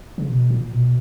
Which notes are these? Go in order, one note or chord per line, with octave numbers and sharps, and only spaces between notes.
C#3
B2
A#2
B2